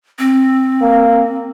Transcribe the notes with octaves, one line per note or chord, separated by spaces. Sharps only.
C4
A#3